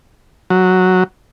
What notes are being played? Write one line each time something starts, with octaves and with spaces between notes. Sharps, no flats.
F#3